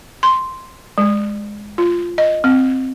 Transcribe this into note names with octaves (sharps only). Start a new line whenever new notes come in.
C6
G#3
F4
D#5
C4